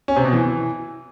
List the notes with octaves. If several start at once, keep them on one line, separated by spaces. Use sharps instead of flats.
C#4
C3
B2
E3